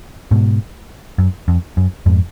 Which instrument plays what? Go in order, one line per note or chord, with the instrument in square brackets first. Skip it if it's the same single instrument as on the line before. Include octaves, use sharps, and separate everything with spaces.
[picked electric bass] G#2 B2
F#2
F2
F#2
F2 G#2